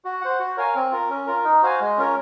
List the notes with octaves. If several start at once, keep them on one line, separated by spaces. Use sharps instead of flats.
F#4
C5 F#5
F#4
A#4 C#5 F5 G#5
C4
F4 A#4
C#4
F4 A#4
D#4
F#4 C5 F5 G#5
G#3
C#4 F4 A#4 C#5